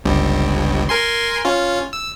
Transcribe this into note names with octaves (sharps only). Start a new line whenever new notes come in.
G1 C#2 G2
A#4 G#5 C6
C#4 F4
E6